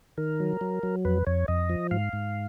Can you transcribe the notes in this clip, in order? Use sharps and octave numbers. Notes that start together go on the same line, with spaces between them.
D#3 A#4
F#3
F#3
F#3
F2 B4
F2 C#5
F2 D#5
F3
G#2 F5
G#2